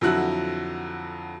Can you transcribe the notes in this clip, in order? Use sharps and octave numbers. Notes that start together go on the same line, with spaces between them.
F2 D3 F#3 E4 F#4 F#6